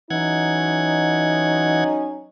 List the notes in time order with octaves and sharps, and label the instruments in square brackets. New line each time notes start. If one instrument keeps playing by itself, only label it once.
[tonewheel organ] E3 F#5 G#6 [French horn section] F#3 C#4 D#4